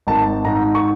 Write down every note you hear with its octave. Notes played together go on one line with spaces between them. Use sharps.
G#1 A5
G#2 A#5
C#6